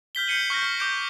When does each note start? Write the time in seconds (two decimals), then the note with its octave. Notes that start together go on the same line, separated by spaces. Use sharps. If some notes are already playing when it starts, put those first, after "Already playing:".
0.15 F6 G6 B6 G7
0.27 G6 C7 C#7 D#7 F#7
0.50 C#6 F6 G6 A#6
0.78 D6 G6 D7 G7